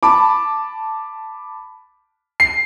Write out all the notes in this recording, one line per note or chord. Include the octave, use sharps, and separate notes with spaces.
A5 B5 D6
C7